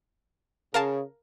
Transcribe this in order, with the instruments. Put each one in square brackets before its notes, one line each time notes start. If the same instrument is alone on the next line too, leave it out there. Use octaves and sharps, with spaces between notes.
[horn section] C#3 [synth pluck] A#4 F5 A5